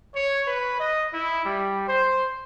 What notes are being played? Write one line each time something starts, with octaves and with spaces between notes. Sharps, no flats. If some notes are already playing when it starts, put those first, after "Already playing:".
C#5
B4
D#5
E4
G3
C5